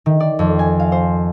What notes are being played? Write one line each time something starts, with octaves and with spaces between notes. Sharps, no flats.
D#3
D5
F2
G#5
F5
C5